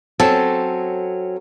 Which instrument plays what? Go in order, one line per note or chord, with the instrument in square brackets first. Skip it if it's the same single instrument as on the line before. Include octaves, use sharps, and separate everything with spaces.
[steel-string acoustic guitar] F#3 C4 C#4 [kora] A4